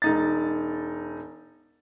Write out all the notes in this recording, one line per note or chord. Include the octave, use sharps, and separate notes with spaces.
E1 D#4 A6